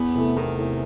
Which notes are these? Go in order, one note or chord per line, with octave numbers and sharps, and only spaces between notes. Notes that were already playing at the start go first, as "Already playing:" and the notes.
Already playing: E2 B3
C3 E3 A3
E2 D#3
C3 E3 A3